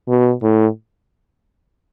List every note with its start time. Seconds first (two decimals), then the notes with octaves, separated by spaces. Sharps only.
0.08 B2
0.43 A2